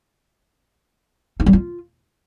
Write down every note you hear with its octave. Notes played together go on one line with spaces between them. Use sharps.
D#4
G3
F4